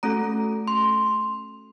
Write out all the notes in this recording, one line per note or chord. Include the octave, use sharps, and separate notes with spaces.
A3 C#4 F#4 A4 A#5
C6